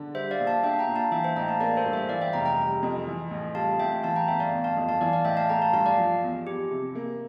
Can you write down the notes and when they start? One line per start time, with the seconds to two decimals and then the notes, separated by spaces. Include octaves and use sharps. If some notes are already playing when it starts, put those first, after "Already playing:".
Already playing: D3 D4
0.14 G3 C5 E5
0.31 D5 F5
0.40 A#1
0.47 F5 A5
0.63 D4 E5 G5
0.79 G5 A#5
0.88 A#2
0.96 F5 A5
1.11 E3 E5 G5
1.24 C5 E5
1.36 A1 G5 A#5
1.48 F5 A5
1.60 A#3 D5 F5
1.77 A4 C5
1.85 G2
1.93 C5 E5
2.09 E3 D5 F5
2.21 E5 G5
2.33 F1 G5 A#5
2.46 G5 A#5
2.58 G3
2.83 F2
3.07 E3
3.31 A1
3.55 G3 F5 A5
3.79 A2 E5 G5
4.03 E3 F5 A5
4.16 G5 A#5
4.28 G1 E5 G5
4.40 D5 F5
4.53 G1
4.64 F5 A5
4.77 F2
4.89 F5 A5
5.01 E3 D5 F5
5.13 D5 F5
5.24 A1 E5 G5
5.37 F5 A5
5.49 A3 G5 A#5
5.62 F5 A5
5.73 G2 F5 A5
5.86 D5 F5
5.98 F3
6.22 E2
6.47 E2 G4
6.71 C3
6.95 A#3